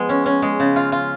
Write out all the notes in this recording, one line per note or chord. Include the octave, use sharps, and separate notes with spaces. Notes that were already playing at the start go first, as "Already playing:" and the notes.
Already playing: F3 G#3 B3
C#4
C#4
G#3
C#3
F4
F4